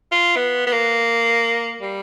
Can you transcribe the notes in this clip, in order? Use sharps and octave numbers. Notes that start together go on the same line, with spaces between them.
F4
B3
B3
A#3
G3